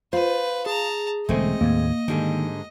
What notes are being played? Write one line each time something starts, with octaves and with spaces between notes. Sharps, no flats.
F4 B4 C5
G#4 A5 A#5
E1 D3 G#3 A3 C4 D#5
D#2 A2 A#3
G#2 D3 D#3 G3